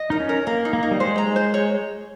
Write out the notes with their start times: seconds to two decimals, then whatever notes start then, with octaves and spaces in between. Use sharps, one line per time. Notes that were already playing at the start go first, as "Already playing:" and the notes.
Already playing: D#5
0.10 D#4 A#4
0.20 C#4
0.29 A#4
0.47 A#3 A#4
0.65 D#4
0.73 A#3
0.83 D#4
0.91 G3
1.00 G#3 C5
1.18 A#5
1.36 C5
1.54 C#5